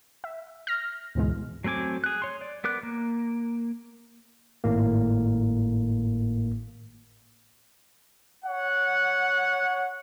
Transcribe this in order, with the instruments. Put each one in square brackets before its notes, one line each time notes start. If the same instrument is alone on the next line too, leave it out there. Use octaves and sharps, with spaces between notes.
[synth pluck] E5
F6 A#6
D2 G#2 B2 E3 G#3
[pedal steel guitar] F#3 A3 C4 G#5 D6
G#4 F#6
C#5 C6
D5
B3 A#4 D6 F#6
A#3
[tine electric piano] G#1 A2 A#3
[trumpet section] C#5 F#5